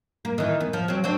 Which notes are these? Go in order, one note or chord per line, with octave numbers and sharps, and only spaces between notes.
A#3
D#3 E3
B3
F3
F#3 C4
C4 D4 F#4